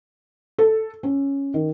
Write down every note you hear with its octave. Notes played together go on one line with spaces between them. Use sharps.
A4
C#4
D#3